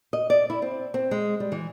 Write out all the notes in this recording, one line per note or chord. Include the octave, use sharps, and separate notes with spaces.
D#5
D5
E4
C4
C4
G#3
G3
E3